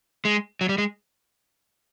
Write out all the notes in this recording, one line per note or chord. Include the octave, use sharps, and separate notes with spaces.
G#3
F#3
G3
G#3